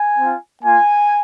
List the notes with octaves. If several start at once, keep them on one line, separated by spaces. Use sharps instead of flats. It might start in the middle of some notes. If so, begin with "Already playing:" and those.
Already playing: G#5
C4 F4
A#3 F4 G#5